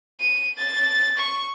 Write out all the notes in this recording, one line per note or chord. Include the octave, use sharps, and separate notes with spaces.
D#7
A6
C#6